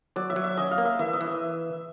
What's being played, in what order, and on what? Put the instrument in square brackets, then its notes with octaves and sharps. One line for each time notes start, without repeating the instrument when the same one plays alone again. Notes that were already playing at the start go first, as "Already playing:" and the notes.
[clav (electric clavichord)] F#3 [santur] D5
[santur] E5
[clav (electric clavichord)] F#3
[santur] E5
[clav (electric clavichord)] C#4 [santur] D#5
[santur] F5
[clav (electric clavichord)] A#3
[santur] E5
[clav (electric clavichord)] E3 [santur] E5
[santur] D#5
[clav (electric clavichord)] E3
[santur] E5